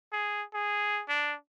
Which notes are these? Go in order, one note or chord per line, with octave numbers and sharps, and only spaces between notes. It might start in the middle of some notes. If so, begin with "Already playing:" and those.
G#4
G#4
D4